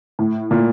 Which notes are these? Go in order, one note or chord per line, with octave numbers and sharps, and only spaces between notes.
A2
A#2